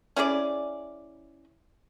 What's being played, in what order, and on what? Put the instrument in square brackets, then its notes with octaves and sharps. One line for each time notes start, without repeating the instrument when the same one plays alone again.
[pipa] C#4 E4 G#4 D5